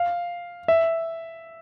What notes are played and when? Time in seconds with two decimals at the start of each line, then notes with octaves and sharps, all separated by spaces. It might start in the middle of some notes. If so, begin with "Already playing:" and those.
Already playing: F5
0.68 E5